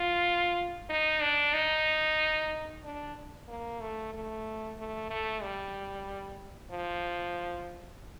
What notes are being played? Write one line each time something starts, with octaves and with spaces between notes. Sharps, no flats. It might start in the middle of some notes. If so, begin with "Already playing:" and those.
Already playing: F4
D#4
D4
D#4
D4
A#3
A3
A3
A3
A3
G3
F3